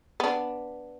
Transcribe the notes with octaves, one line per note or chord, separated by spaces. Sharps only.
B3 D4